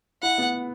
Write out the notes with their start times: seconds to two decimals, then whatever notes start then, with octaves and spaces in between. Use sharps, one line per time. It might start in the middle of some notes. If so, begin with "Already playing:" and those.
0.23 E4 F#5
0.38 B3